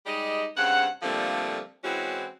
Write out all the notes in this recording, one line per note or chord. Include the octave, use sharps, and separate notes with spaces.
G3 G#3 D#4 G4 D#5
G2 C#3 C4 F#5
D3 F3 G3 A3 A#3 C4
E3 G#3 C4 C#4 E4 F#4